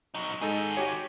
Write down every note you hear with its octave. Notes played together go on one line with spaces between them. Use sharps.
F#3 D#4
D#3 G#3 D#4 G#4 A4
F#4 G4 C#5